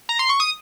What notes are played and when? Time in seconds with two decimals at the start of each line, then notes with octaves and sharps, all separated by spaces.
0.09 A#5
0.19 C6
0.29 C#6
0.40 D#6